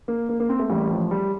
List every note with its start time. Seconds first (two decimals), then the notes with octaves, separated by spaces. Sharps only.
0.08 A#3
0.29 A#3
0.40 A#3
0.49 C4
0.59 A3
0.69 A1 A2 G3
0.90 F3
1.11 G3